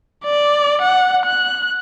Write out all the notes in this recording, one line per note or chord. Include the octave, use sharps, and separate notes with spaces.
D5
F#5
F#6